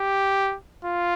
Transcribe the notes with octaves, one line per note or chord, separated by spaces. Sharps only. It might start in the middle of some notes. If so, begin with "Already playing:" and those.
Already playing: G4
F4